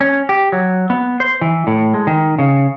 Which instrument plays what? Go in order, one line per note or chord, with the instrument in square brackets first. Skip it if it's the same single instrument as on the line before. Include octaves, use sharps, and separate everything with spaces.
[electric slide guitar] C#4
G4
F#3
B3
C5
E3
A2
G#3
D#3
C#3